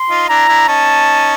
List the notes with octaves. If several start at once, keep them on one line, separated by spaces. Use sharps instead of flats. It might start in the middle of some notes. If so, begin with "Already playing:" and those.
Already playing: C6
D#4 F4
D4 E4 A#5
D4 E4
C#4 D#4 A5